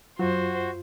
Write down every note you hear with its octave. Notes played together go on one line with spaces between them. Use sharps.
F#2 F#3 F4 F#4 C5